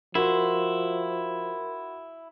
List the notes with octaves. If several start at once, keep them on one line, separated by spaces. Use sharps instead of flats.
F3 E4 F#4 A#4 C6